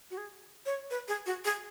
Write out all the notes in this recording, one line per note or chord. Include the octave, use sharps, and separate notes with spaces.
F#4
G#4
C#5
B4
G#4
F#4
G#4